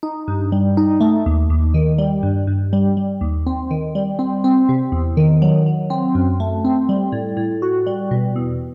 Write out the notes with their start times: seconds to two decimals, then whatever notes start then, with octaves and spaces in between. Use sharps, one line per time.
0.03 D#4
0.28 G2
0.52 G3
0.77 D#4
1.01 A3
1.26 D#2
1.50 D#2
1.74 D#3
1.98 G3
2.23 G2
2.47 G2
2.73 G3
2.97 G3
3.21 D#2
3.46 C4
3.71 D#3
3.95 G3
4.19 C4
4.44 C4
4.69 C3
4.92 E2
5.17 D#3
5.42 F#3
5.66 F#3
5.90 C4
6.15 F#2
6.40 A3
6.65 C4
6.89 G3
7.12 A2
7.37 A2
7.62 F#4
7.87 G3
8.11 B2
8.36 E2